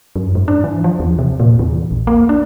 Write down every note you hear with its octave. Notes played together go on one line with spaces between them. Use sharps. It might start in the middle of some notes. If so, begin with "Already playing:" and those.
F#2
G#2
D4
E3
F3
E2
C3
A#2
E2
A#1
A#3
D4